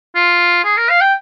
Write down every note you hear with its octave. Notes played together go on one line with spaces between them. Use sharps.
F4
G#4
A#4
F5
G5